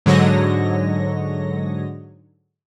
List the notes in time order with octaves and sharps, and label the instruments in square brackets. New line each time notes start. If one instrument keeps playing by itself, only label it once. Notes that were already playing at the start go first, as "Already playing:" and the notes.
[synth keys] G#2 D3 F#3 C#5 D#5 A#6